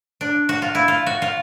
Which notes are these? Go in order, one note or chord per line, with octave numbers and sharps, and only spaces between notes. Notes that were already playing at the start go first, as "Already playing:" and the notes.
D4
F#4
F4
E4
F4
F#4
F4